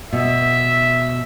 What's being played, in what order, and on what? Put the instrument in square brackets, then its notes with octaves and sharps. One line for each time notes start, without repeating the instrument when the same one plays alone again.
[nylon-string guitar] B2 [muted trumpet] E5